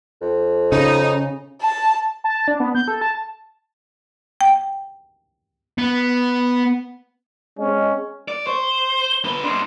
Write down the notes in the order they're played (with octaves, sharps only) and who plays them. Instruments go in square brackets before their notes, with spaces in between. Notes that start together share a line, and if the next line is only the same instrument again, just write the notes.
[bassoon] F2
[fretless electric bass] C#3 [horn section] D#4
[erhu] A5
[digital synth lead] A5
D4
B3
G6
A4
A5
[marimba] G5
[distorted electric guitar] B3
[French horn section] G#3 C4 D#5 [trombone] C#4
[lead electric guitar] D5
[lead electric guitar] C5 [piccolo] C#6
[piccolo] G7
[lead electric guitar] D3 B4
[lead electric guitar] C4 D4 [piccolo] C6